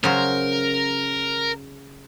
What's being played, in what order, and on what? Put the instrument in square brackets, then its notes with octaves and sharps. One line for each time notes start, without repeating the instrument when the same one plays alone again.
[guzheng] C#3 F#3 C5 [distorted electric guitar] A#4